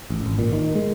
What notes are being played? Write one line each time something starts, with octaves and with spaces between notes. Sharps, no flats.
A1
G#1
A#2
D#3
G#3